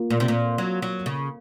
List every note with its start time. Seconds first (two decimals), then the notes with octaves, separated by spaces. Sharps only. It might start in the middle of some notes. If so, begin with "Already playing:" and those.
Already playing: A#3 F4 A#4
0.10 A#2
0.20 C3
0.28 A#2
0.58 F#3
0.82 F#3
1.06 C#3